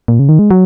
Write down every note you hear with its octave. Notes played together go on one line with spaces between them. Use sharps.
A#2
C#3
D#3
G#3
F#3